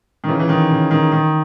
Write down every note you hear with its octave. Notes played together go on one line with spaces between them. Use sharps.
D#3
C#3 E3
E3
D#3
C#3
D#3
D#3